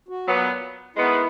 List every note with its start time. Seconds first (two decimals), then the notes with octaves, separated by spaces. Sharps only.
0.09 F#4
0.27 A#2 F#3 B3
0.96 D#3 G#3 B3 E4